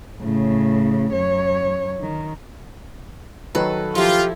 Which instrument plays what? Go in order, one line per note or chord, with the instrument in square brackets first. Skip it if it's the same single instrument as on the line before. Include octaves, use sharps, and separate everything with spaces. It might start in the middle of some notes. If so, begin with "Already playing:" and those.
[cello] A2 C#3
F#2 C#5
D#3
[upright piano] D#3 F#3 B4 [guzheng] A4
[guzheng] F3 E4 [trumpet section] F4 [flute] G4